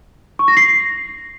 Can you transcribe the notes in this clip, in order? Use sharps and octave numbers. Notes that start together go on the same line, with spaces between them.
C#6
A#6
C7